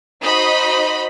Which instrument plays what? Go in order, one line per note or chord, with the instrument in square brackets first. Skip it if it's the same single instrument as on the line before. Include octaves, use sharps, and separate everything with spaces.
[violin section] D#4 F#4 C5 D#5 B5